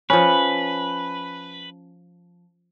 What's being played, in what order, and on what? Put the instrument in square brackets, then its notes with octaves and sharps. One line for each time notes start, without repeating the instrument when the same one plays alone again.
[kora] F3 C#4 [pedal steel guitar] B4